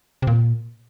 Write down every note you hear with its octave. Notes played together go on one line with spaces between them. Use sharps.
C3
A#2